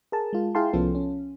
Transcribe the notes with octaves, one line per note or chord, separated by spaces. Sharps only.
G#4 A#4 A5
G#3 F4
E4 G#4 F5 G5 A5 C6
C2 F3 B3 C#4 F4 A4
C#4